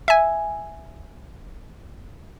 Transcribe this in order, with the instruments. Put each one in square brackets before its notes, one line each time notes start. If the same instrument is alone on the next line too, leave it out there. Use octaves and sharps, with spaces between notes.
[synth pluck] E5 G#5